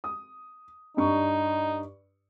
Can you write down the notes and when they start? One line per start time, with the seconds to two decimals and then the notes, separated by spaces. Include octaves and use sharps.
0.04 D#6
0.97 G2 D4 D#4 C#6